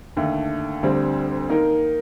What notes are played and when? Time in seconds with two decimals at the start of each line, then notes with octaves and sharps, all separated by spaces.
0.17 D#2 D3 A3
0.83 D2 D3 G3 C4
1.50 D#3 A#3 D#4 A#4